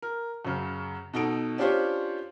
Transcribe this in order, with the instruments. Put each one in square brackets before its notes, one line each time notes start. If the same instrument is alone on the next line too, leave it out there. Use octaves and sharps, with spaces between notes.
[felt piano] A#4
F#2 C#3
B2 D#4 A4 D7
C#4 D4 F4 G4 C5 C#5